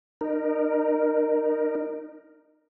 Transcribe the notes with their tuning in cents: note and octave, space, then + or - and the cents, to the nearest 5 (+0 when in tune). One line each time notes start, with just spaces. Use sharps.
D#4 -30 A#4 +0